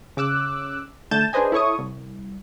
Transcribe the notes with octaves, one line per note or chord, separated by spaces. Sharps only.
C#3 D6 E6 F#6
D3 A3 A5 G6 A6 E7
D4 G#4 B4 C5 D#5 G#5
E4 A4 C#5 C#6 D#6
C2